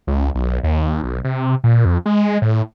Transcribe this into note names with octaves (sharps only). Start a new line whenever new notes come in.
C#2
B1
D#2
B1
C3
A#2
F2
G#3
A2